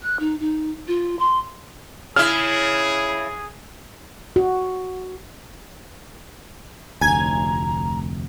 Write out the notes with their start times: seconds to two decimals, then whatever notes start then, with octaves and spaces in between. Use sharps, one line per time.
0.02 F#6
0.19 D#4
0.40 D#4
0.87 F4
1.19 C6
2.16 C#3 E4 G#4 F6
4.36 F#4
7.01 F1 D2 G#5 A#5 G#6